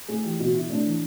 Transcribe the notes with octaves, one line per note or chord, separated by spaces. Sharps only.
A2 G#4
E3 G4
B2 F#4
B2 E4
A2 D4
E3